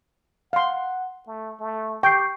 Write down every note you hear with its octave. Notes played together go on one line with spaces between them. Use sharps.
F5 F#5 C6
A3
A3
G4 G5 C#6 G6 C7